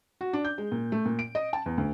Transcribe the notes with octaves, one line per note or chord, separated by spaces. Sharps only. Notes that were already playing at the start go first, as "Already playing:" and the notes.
F#4
D4
G6
G#3
A#2
A3
A#2
D7
D#5
A5
E2
D2